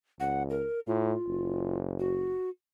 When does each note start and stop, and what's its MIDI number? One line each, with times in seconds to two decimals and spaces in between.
0.20 0.65 37
0.20 0.43 78
0.50 0.80 70
0.87 1.14 45
0.87 1.77 65
1.27 2.36 30
1.99 2.49 66